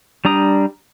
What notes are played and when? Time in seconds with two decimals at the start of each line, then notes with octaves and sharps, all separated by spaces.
0.25 G3 D4 A#5 D#6